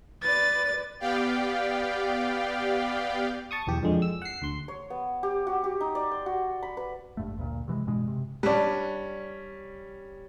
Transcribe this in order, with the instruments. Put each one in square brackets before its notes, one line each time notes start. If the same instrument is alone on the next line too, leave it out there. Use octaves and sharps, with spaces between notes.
[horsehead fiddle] B4 D5 [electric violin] A6
[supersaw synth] B3 G4 D5 F5 G5
[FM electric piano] A5 C#6 D#6
B1 E2 G4
F2 D3 G#3
E6
F#5 C7
D2 C6
[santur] C#5
B3
G4
F#4
G4
D#4
D5
C6
F#4
B5
B4
[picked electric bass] G#1 G2 A3
D2 G2 A#2
C3 E3 G#3
G2 B2 G#3
C3
[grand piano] G3 C#4 [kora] D4 B4